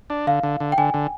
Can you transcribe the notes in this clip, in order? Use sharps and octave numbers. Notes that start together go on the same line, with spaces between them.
D4
D3 F5
D3
D3
G5
D3 G#5
D3